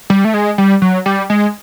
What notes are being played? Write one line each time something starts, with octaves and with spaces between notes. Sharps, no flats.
G3
A3
G#3
G3
F#3
G3
G#3